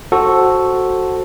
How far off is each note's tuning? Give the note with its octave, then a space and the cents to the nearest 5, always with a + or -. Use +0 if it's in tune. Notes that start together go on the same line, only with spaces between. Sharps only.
F#4 +0 A4 +0 C5 +15